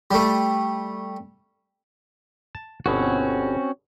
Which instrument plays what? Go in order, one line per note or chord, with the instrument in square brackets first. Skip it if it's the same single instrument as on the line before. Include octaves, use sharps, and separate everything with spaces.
[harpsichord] G3 A3
[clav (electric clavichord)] A5
[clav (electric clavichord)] G1 B2 [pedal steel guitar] C4 C#4 F#4